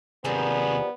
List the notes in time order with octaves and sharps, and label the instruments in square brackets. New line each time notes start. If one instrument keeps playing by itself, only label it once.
[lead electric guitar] D#2 C3 [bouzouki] D#3 F3 G3 [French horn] B3 [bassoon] G#4